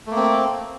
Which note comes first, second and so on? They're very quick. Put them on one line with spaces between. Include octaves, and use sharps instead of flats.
A3 A#3 C4